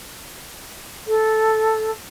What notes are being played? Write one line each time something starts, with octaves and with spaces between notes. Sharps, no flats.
A4